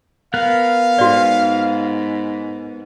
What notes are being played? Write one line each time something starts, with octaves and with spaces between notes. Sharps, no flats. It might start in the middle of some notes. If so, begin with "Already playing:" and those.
B3 A#4 F5 F#6
G#2 F#4 D5